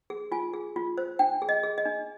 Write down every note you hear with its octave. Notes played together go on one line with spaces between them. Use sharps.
G#4
F4 G#5
G#4
F4
C5
D4 G5
G#4
D#5
G#4
D#5
D4